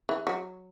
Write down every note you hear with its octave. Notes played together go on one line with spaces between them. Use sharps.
E3
F#3